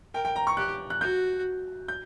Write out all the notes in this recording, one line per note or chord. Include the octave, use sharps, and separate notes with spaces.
A#4 G5
G5
A#5
C#6
G4 F#6
F#6
F#4 G6
G6